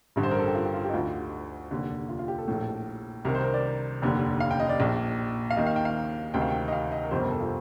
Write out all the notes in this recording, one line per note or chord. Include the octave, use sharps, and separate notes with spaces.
A1 G2 D3
C5
A#4
A4
G4
F4
G4
F4
G4
D#4
D2 D3 F4
F1 D#2 D3
F4
F4
G4
A4
A#1 A2
C2 C3 D#3 A#4
C5
A#4
D5
F1 D#2 D3
F5
G5
D#5
D5
A#1 A#2
F5
D#2 D#3 D#5
F5
G5
F5
D2 C3 D#3 G5
F5
G5
D#5
F5
D#5
A#4
G1 F2 C3 C5
A#4
A4
F4